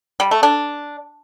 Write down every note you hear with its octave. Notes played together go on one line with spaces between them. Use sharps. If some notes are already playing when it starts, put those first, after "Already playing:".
G3
A3
D4